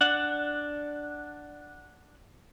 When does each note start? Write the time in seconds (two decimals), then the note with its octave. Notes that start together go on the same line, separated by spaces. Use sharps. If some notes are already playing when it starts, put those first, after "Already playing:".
0.01 D4 F#5